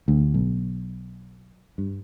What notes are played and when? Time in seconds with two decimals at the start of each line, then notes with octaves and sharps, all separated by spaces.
0.08 D2
0.34 B1
1.78 G2